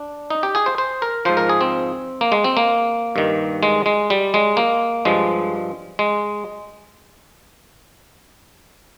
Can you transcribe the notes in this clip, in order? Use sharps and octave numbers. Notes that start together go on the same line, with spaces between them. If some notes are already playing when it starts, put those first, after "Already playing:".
Already playing: D4
D#4
G4
G#4
C5
C5
A#4
G#2 F3 C5
A#4
G#4
C4
A#3
G#3
C4
A#3
G2 D#3
G#3
G#3
G3
G#3
A#3
G2 F3 G#3
G#3